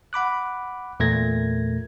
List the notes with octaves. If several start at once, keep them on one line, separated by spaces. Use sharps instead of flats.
F#5 B5 D6 F#6
E2 A#2 A3 A#4 G#6 A#6